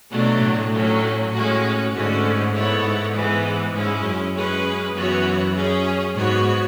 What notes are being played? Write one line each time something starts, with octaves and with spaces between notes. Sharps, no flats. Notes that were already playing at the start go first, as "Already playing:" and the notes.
B2 F#3 A3 D4
A2
F#3 A3 C#4
A2 G#3 C#4 F#4
G#2 D3 A3 C#4 F#4
B3 E4 A4 C#5
G#2
E3 G#3 B3
G#2 G#3 C#4 E4
F#2
G#3 C#4 G#4 B4
F#2 E3 B3 F#4 C#5
C#4 G#4 C#5
G#2 B3 F#4 C#5